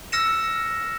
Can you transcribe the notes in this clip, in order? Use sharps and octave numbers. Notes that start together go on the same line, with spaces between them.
E6 F6 A#6 C#7 E7